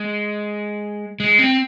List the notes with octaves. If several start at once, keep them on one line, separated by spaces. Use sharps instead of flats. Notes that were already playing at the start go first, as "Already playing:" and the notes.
Already playing: G#3
G#3
C4